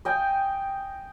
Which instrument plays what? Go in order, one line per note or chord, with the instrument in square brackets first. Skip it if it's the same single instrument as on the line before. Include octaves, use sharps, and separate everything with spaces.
[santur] D#5 G5 G#5